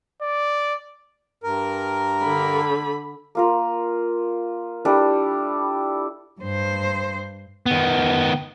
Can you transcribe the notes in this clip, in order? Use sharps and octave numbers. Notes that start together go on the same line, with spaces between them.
D5
G2 A#4
D3 B5
A#3 F4 A#4
G3 D4 E4 A4
G2 C5
D#3 B3